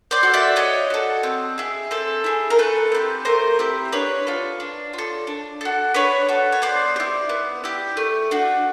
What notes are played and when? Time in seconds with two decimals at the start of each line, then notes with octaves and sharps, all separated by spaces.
0.11 C5 D5
0.23 F#4 A4
0.34 D5 E5
0.56 D4 C#5 D#5
0.90 F#4 A4
1.23 C4
1.58 E4 G#4
1.91 C4 A4
2.24 E4 G#4
2.50 A#4
2.58 A3 A4 B4
2.92 C4 E4 G4
3.25 A3 A#4 C5
3.59 C4 E4 G4
3.92 D4 B4 C#5
4.27 F4 A4
4.60 D4
4.93 F4 A4
5.27 D4
5.61 F#4 A4
5.94 D4 B4 C#5
6.29 F#4 A4
6.52 C#5
6.62 B3 C5 D5
6.96 G4
7.00 E4
7.29 B3
7.64 E4 G4
7.97 A3
8.31 D4 F#4